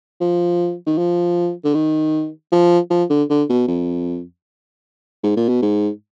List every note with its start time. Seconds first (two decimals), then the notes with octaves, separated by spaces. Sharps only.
0.20 F3
0.87 D#3
0.98 F3
1.65 D3
1.75 D#3
2.52 F3
2.91 F3
3.10 D3
3.30 D3
3.50 B2
3.68 F2
5.24 G#2
5.37 A#2
5.49 B2
5.62 G#2